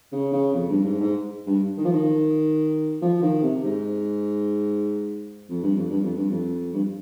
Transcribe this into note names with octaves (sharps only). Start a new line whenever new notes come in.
C#3
C#3
F2
G2
G#2
G#2
G2
D#3
F3
D#3
F3
D#3
C3
G#2
F2
G2
F2
G2
F2
G2
F2
G2